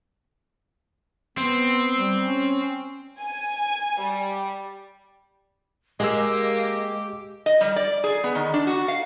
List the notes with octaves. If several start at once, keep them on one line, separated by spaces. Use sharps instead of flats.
B3 C4
G3
C#4
G#5
G3
G#3 A#3 G4 D#5 E6
D#5
G3
D5
G#4
B3
D#3
D4
F#4
F5